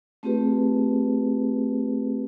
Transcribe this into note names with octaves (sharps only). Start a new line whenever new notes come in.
A3 C4 F4 G4 G#4 B4